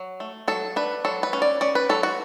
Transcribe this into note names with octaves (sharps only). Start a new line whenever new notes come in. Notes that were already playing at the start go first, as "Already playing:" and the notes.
Already playing: F#3
A3
F#3 A4
D4 B4
F#3 A4
B4
C#4
D5
C#4 D5
B4
F#3 A4
F#4